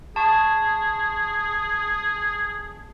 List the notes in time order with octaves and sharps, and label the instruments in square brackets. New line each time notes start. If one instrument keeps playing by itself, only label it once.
[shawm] G#4 [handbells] A5 C#6